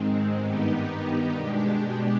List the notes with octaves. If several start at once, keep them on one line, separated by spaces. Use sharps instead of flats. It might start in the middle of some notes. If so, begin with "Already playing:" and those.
Already playing: G#2 D#3 G#3 C4
G2 D#3 B3 D#4 G4
B2 G#3 D4 G4